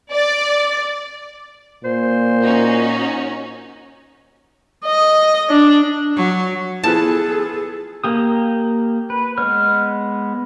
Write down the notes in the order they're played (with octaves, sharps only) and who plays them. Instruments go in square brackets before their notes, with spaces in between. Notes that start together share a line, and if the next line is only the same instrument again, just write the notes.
[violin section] D5
[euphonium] A#2 [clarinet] C5
[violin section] C#4 D#4 F#4
[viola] D#5
D4
[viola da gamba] F#3
[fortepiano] F3 B4 [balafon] B3 E4 [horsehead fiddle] G#4 A4 [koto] A5
[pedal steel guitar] A#3 G4 D#6
B4
G#3 B3 C#5 F6